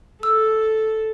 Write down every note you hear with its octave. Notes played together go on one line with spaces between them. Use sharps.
A4 E6